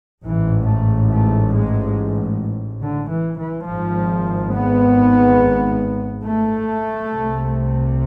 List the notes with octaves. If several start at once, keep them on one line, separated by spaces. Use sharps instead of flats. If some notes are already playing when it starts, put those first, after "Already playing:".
A1 G#2 E3
A3
A3
G#3
D3
E3
E3
G#1 G#2 F3
B3
A3
C2 C3